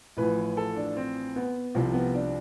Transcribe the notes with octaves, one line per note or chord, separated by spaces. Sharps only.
A1 A2 F3 B4
A4
D4
C4
B3
C2 C3 F3
B3
D4